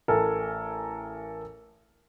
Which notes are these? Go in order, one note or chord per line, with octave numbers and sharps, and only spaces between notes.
A1 A4 A#4 G#5